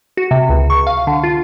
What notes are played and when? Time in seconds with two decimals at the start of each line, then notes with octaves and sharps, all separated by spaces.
0.17 F#4
0.31 C3
0.49 C#2
0.70 C#6
0.87 F5
1.07 D3
1.24 F4